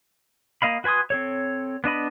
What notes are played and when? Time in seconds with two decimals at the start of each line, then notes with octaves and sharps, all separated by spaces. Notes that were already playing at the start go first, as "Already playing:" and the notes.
0.62 A#3 D#5 F5 B5
0.84 F#4 B4 G#5 C6 D#6
1.10 C4 A4 C#5
1.84 B3 D4 D#5 B5